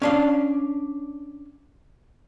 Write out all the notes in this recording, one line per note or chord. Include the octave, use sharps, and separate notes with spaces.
C#4 D4 F5